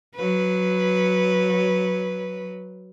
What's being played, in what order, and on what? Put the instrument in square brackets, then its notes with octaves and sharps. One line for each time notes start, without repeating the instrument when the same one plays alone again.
[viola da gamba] F#3 B4